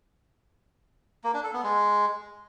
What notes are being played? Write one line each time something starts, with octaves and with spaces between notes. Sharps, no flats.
A#3
D4
A4
B3
G#3